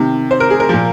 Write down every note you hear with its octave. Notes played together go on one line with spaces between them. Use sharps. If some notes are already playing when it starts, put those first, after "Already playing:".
Already playing: C3 D#3
C5
A#4
G#4
A#4
A#2 F3